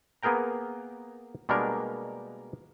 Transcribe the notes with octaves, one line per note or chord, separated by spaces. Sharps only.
A#3 B3 G#4 A#4 G5 A#5
B2 G3 G#3 A#3 D4 A#4